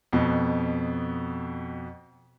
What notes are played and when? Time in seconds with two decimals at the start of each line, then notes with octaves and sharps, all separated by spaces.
0.13 F2 B2